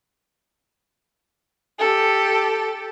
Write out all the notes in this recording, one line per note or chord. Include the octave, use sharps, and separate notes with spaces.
G4 A4